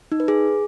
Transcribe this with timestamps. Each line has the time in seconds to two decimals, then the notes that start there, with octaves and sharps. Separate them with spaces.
0.12 D#4
0.20 B4
0.28 G#4